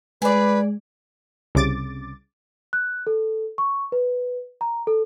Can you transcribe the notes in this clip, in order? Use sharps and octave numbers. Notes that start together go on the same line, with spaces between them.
G#3 G#4 B4 D5
C2 C#3 D6 A6
F#6
A4
C#6
B4
A#5
A4